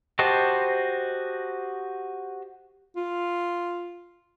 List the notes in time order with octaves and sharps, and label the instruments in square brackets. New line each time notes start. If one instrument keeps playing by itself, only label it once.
[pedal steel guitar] F#4 G4 C5 D#5 A5
[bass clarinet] F4